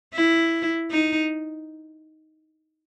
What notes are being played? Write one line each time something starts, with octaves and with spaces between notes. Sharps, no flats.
E4
D#4